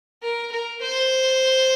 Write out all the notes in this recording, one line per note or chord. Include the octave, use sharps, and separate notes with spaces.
A#4
A#4
C5